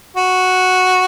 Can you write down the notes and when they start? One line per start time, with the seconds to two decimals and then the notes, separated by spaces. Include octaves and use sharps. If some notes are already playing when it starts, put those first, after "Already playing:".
0.16 F#4